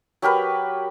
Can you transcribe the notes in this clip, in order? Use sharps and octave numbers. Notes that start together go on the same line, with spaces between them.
F#3 G4 A#4 B4